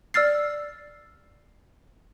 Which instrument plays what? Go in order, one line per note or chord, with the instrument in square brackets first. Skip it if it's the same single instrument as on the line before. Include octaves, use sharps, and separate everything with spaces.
[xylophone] D5 E6 F6 A6 C7